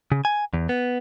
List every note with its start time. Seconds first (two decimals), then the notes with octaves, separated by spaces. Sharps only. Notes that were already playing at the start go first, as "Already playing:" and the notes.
0.12 C#3
0.25 G#5
0.53 E2
0.69 B3